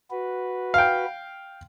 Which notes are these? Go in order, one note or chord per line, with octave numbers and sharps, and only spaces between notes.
F#4 B4
F5 G5